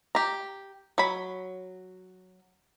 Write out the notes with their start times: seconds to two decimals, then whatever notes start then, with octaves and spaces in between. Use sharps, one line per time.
0.15 G4 A#5
0.98 F#3 B5